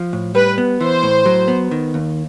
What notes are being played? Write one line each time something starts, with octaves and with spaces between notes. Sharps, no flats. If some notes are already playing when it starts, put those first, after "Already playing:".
Already playing: F3
A2
G3 B4
B3
E3 C5
A2
F#3
B3
D#3
D#2